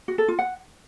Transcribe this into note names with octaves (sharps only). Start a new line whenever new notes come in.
F#4
A4
F4
F#5